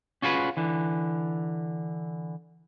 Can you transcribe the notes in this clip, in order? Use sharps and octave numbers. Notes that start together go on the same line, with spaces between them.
C#4 F4 F#4 G#4 B4
D3 E3